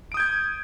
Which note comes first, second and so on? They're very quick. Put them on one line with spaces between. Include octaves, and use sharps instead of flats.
D7 D#6 G6 G#6